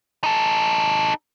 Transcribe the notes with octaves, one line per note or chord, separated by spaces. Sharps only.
D#4 A4